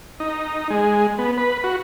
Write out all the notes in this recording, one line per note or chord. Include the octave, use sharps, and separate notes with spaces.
D#4
G#3
B3
B4
F#4